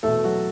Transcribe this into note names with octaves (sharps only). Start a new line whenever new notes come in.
E2 B2 A3 A4
F#3 F#4